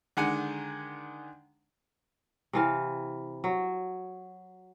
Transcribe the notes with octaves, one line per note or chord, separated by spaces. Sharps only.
D3 D#3 G#3 F#5 G#5
C3 E3 F5
F#3